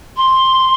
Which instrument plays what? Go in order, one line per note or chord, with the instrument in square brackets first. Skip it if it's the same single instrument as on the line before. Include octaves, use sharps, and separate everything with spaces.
[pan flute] C6